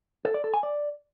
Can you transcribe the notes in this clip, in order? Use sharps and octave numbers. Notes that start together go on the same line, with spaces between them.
A4
D5
A4
G#5
D5